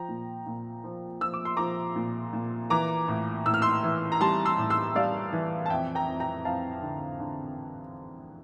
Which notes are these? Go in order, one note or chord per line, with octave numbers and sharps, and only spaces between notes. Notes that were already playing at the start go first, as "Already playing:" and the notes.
Already playing: F3 G5 A#5
A#2
A#2
F3
F3 E6
D6
C6
F3 A#5 D6
A#2
A#2
E3 A#5 D6
A2
A2 E6
F6
C6 E6
E3
A#5
G3 A5 C6
C6 E6
A2
C6 E6
G3 D5 F5
E3
A5
F2 E5 G5
G5 A#5
F2
G5 A#5
F2 F5 A5
D3
D3